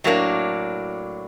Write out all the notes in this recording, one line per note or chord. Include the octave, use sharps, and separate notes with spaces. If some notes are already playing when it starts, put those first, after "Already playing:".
A2 F#3 A#3 D4